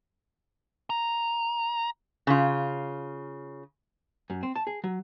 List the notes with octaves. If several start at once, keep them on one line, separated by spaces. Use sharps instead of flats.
A#5
C#3 F4
F#2
C4
A5
G#4
F#3